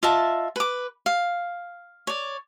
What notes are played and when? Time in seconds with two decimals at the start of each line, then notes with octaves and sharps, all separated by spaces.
0.03 F4 D#5 E5 A5
0.56 B4 D6
1.06 F5
2.07 C#5 D5